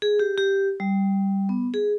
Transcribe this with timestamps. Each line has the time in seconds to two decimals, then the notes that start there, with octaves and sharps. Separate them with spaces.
0.02 G#4
0.19 G4
0.38 G4
0.80 G3
1.49 B3
1.74 G#4